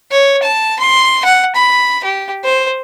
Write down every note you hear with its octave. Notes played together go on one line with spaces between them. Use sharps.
C#5
A5
C6
F#5
B5
G4
C5